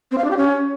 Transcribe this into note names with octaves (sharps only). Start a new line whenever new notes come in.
C4
F5
D4
G4
C#4